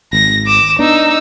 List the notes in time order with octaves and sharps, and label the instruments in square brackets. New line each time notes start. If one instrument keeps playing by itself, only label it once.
[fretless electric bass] G#1 [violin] A#6
[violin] D6 E7
[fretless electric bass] B3 D4 [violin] D#4 E6